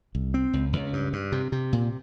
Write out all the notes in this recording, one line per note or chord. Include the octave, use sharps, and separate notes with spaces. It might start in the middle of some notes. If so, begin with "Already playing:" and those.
C2
C4
C#2
C#2
G2
G2
C3
C3
A#2